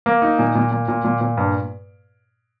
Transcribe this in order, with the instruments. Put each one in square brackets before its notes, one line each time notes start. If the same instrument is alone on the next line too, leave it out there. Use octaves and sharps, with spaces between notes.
[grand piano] A#3
D#4
A#2
A#2
A#2
A#2
A#2
A#2
G2